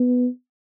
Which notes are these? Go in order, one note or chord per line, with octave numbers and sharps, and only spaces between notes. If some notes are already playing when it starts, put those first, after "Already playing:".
Already playing: B3